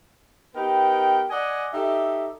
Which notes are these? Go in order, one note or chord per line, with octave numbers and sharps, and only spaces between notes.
B3 D#4 G4 A#4 B4 G5
D5 D#5 F#5 G#5
D#4 G4 A4 E5